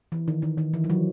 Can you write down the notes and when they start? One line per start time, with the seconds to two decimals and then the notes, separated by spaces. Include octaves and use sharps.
0.12 E3
0.28 D#3
0.42 D#3
0.58 D#3
0.74 E3
0.84 F3
0.90 F#3